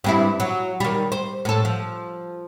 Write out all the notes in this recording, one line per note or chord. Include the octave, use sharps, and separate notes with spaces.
G2 C4 E4
F#3
D#3 G3
C5
A2 A4
F3